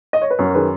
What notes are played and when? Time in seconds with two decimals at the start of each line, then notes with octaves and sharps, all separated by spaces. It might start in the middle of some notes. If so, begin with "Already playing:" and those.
0.13 D#5
0.22 C#5
0.30 B4
0.39 F#2 F#4 A#4
0.54 D#3 G#4 B4